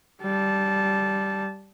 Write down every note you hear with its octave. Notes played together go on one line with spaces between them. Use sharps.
G3 A5